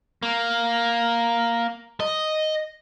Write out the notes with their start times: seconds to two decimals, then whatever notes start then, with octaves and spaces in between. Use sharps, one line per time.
0.23 A#3
2.00 D#5